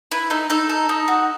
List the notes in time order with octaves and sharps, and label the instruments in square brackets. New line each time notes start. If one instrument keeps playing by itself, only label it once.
[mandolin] E4 B4
D#4 A4
D#4 A4
A4
D#4
F#4